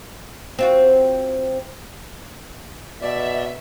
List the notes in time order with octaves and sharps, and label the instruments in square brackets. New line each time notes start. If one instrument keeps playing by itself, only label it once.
[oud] C4 F4 F#4
[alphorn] B2 [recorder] D5 [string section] E5